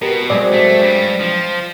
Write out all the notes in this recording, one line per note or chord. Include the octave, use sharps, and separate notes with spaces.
B2 G4 A#4
F#3 G#3 C4 D5
A3
G2 G3
F3